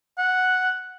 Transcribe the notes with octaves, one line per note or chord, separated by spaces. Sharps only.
F#5